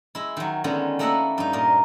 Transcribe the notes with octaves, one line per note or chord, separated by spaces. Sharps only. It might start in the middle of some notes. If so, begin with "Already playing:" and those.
G#3 E4
D#3 F#3
D3 D#3 G#3 B3 C#4
A3 A#3 E4 D#5 E5 F#5
G2 D#4
A#2 A#4 D#5